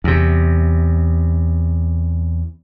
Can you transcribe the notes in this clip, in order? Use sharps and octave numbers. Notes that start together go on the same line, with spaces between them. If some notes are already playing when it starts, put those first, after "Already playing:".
E2 C3